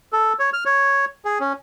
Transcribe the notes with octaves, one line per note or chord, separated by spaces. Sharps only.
A4
C#5
F6
C#5
G#4
C#4